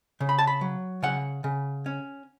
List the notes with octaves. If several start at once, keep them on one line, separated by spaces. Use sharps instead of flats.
C#3
B5
A5
B5
F#3
C#3 F#5
C#3
C#4